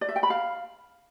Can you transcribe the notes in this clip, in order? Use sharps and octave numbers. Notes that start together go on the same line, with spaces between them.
D5
E5
G5
B5
F5